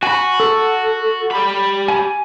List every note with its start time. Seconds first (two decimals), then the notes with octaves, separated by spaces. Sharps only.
0.03 F#4 G#5 B5
0.40 A4
1.31 G4 B5
1.88 G#5